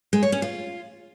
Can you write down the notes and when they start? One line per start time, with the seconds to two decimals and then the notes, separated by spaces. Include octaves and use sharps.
0.13 G#3
0.23 C#5
0.32 C#4
0.42 F4